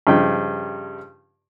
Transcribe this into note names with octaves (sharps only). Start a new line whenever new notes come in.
G2 C#3 F3 D#4 G5